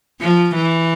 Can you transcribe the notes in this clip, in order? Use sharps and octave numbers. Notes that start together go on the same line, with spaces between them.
F3
E3